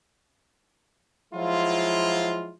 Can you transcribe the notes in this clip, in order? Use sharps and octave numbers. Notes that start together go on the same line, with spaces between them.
F3 F#3 G#3 E4 F4